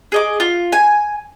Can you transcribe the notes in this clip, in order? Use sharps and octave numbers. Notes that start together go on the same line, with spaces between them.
G#4 D#5 D6
F4
G#5